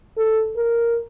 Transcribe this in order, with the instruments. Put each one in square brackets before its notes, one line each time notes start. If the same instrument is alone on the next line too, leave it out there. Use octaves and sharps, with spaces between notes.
[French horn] A4
A#4